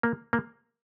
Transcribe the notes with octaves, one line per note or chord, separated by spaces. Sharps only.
A#3
A#3